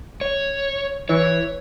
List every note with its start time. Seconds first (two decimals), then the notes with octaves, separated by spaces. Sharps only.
0.21 C#5
1.09 E3 C#5